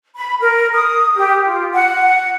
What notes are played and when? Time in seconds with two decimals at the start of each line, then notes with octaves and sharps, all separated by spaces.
0.16 B5
0.40 A#4
0.73 D#6
1.15 G4
1.44 F4
1.74 F#5